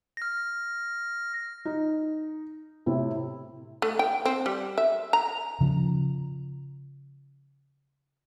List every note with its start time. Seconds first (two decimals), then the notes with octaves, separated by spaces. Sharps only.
0.17 F6 A#6
1.65 D#4
2.86 A2 C3 C4 E4
3.82 A3
3.99 G5
4.26 C4
4.46 G3
4.78 E5
5.13 A#5
5.61 C#3 F3